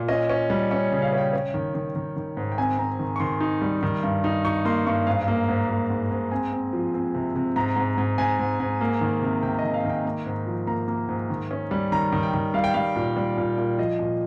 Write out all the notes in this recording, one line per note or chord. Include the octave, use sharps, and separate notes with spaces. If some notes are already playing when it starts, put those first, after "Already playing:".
Already playing: A#2
C#4 D#5
C#4
G3
C#4 C#5
C#3
F5
C#4
G5
C#4
D#3
D#3
D#3
D#3
G#2
G5
C4 G#5
C4 A#5
D#3
C#6
D#3 C6
D#4
G3
D#3
G2
D#4
D#4 C#6
A#3 C6
G2 C#6
G#2 F5
A#3
G#2
A#3
G#2
G#2
C4 G#5
C4
F3
C4
C3
C3
G#2 A#5
G#2
G#2
G#2 G#5
G#2
G#2
A#3
D#3
C3
C3 G5
D#3 D#5
F5
D#3
G5
A#3
G#2
F3
A#3 A#5
A#3
G#2
D#3
C#4
G3
D#3 A#5
D#3
G5
D#3
G3 F5
G5
G3 F5
A#2
G3
A#2
A#2
F3 D#5
A#2